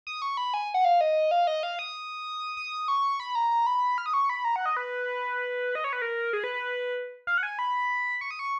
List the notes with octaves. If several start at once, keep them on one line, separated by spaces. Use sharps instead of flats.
D#6
C#6
B5
G#5
F#5
F5
D#5
F5
D#5
F5
D#6
D#6
C#6
B5
A#5
A#5
A#5
B5
F6
D#6
C#6
B5
A#5
F#5
D#5
B4
D#5
C#5
B4
A#4
G#4
B4
B4
F5
F#5
G#5
B5
C#6
D#6
C#6